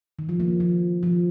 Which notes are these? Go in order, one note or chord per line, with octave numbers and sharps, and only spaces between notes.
D#3
F3
F3 A#3
F3
F3